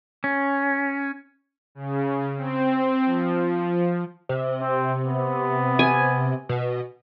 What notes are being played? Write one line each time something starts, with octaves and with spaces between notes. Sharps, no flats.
C#4
C#3
C4
F3
C3
C4
B3
G#5
B2